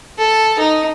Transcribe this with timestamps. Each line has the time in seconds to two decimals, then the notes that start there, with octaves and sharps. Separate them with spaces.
0.18 A4
0.59 D#4